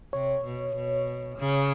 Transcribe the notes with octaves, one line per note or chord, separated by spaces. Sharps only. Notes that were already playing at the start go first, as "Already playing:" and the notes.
C3 C#5
B2
B2
C#3